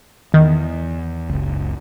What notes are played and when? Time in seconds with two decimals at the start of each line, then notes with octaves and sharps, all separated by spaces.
0.34 E2 D#3
1.30 F#1 C#2